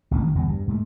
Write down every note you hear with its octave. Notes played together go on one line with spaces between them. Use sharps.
A1 D2 G3 C#4
D#3 F3
G1 E2 A#2
G2
G#2 A3